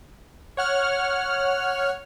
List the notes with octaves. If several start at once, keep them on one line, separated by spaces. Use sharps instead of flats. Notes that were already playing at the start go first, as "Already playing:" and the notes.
C#5 F#5 F6